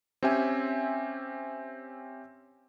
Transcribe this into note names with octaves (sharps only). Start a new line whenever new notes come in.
C4 C#4 G4 E5 G#5